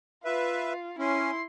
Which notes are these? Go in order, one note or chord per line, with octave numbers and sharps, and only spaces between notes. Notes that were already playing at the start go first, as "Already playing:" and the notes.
F4 B4 E5
C#4 E4 C6